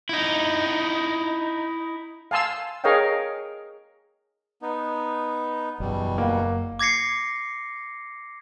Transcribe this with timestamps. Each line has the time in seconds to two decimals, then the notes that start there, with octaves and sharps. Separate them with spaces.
0.09 D#4 E4
2.31 F5 G#5 A5 C6 E6
2.84 G#4 A#4 C#5 D#5 F5 G5
4.62 B3 D#4
5.80 F#1 E2 B2 G3
6.18 A#3 F#5
6.79 D6 G#6 A#6 C7 C#7